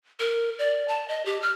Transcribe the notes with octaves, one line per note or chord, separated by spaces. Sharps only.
A#4
D5
A5
D#5
G4
F6